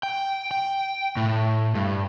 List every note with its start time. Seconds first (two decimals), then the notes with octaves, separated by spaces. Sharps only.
0.03 G5
0.51 G5
1.17 A2
1.75 G2